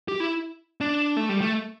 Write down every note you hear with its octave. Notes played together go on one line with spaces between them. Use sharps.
G4
E4
D4
A3
G3
A3